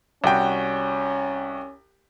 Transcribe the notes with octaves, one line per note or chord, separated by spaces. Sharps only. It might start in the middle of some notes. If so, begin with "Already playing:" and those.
C2 C#4 F#4 G5